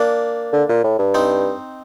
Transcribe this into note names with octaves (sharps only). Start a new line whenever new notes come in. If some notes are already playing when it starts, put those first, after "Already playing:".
Already playing: A#3 D4
D3
A#2
A2
G2
C4 D#4